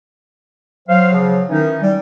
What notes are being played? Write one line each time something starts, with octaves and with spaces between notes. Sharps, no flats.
F#3 C5 F5
C#3 F3
D#3 E3 C#4 D#4
G3